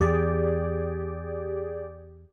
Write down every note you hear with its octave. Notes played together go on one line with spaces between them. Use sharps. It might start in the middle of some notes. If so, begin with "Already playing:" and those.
E2 G4 G#4 D5